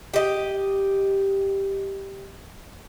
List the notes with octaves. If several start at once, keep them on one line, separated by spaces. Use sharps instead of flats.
G4 D#5